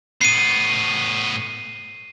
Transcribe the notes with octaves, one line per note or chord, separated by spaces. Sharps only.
A2 B3 C7 D#7